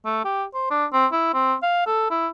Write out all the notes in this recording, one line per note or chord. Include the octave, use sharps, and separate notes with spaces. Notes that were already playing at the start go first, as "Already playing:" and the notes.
A3
G4
C5
D4
C4
E4
C4
F5
A4
E4